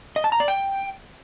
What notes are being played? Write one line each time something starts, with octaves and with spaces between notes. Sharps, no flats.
D#5
A5
A#5
D5
G5